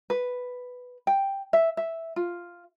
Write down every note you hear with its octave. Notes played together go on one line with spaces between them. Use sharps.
B4
G5
E5
E5
F4